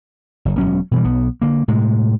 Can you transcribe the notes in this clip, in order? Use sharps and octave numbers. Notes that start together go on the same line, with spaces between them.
F#1
E1 D#2 F#3 C#4
B2 E3 G3
B1 B3
D3 A#3
A2 C3 G#3